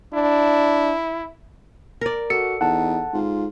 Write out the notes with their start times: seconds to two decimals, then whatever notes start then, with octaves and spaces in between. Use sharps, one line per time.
0.14 D4 E4
2.01 A#4 D5
2.30 F#4 A4 C#7
2.61 E2 D#4 F#5 A5
3.13 G#2 F4